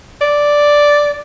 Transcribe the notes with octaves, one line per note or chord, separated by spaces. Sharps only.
D5